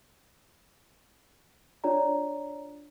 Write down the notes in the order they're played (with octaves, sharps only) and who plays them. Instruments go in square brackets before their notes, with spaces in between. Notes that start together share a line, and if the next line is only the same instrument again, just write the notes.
[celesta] D4 F4 C#5 D5 A#5